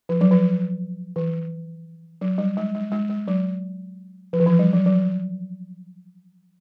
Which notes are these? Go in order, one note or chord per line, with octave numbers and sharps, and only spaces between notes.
F3
F#3
F3
E3
F#3
G3
G#3
G#3
G#3
G#3
F#3
F3
E3
F3
G3
F#3
F#3